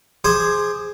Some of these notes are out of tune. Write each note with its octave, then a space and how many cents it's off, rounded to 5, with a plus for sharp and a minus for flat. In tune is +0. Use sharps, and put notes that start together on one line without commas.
G#4 +0 C5 +0 D6 +30